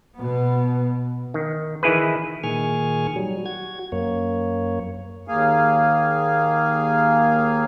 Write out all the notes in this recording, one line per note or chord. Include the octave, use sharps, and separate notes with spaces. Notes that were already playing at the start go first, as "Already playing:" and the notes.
B2 B3
D#3
D#3 E3 E4 G#4 B4
A#2 D#3 G#4 G#5 C#6 F6
F#3 G3
F#4 G#6
F#2 A#3 C#5
D#2 A#3 G#4 F5 G#5